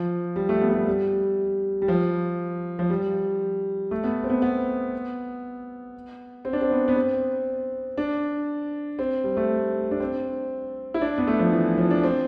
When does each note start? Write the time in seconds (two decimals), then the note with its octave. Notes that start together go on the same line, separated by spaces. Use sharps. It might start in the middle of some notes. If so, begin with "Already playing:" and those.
Already playing: F3
0.36 G3
0.49 A3
0.61 B3
0.69 A3
0.74 G3
0.87 G3
1.82 G3
1.88 F3
2.79 F3
2.90 G3
3.91 A3
4.04 B3
4.24 C4
4.30 B3
4.42 B3
6.45 C4
6.53 D4
6.61 C4
6.71 B3
6.88 B3
6.96 C4
7.97 D4
8.99 C4
9.24 G3
9.37 A3
9.91 D4
10.00 C4
10.94 E4
11.01 D4
11.18 B3
11.27 A3
11.39 F3
11.52 E3
11.78 F3
11.91 D4
12.03 C4